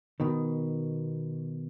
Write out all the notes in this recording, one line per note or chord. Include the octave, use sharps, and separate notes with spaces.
B2 D#3